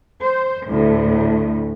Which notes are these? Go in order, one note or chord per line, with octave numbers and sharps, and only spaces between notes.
C5
D2 A2